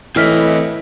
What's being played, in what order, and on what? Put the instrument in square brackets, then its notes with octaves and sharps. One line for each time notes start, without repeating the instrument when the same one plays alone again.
[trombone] A2 [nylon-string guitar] E3 [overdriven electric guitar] C4 D#5 [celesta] E4 F6 B6